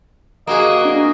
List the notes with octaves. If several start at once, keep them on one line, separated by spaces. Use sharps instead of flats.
A#3 F#4 G#4 D#5
D4